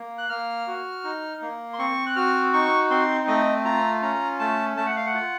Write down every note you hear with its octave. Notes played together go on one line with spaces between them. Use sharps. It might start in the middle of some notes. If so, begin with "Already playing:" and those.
Already playing: A#3
F#6
A#3 F6
F#4
D#4
A#3
C6
C4 C#6
F#6
F#4 F6
D#4 C#6
C4 C6
A3 D#5
F4 A#5
C#4 A#5
A3 A5
A3 A5
F#5
F5
F#5
F4